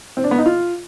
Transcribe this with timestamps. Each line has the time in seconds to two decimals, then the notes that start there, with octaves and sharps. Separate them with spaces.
0.17 C4
0.24 D4
0.31 B3
0.38 D#4
0.46 F4